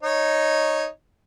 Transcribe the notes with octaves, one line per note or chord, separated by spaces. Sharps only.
D#4 C#5